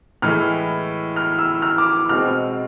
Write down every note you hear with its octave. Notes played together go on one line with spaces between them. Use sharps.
A2 E3 G#3 F6
F6
E6
F6
D6
B2 G#3 C4 F6